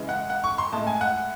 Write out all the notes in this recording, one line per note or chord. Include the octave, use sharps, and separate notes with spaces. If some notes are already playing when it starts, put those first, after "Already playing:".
Already playing: C#3 E3 G#3
F#5
F#5
C#6
C6
A2 G#3 A5
G#5
F#5